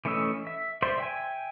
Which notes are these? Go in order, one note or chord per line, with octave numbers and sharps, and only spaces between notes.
E3 A3 C#4 D#5 E6
E5
C5 D5 E5 C6
E5 G5 G#5